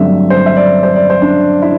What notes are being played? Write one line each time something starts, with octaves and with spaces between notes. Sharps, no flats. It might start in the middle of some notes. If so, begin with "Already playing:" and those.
Already playing: G2 D3 F#3 A3 C4 E5
C5
E5
D5
C5
D5
C5
D4
E4